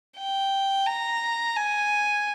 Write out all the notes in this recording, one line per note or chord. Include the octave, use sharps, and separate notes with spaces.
G5
A#5
G#5